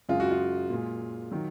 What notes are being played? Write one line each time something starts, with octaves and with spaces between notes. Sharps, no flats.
F#2 C#3 G#3 F4
F#4
F4
A#2 G#3
D#3 F#3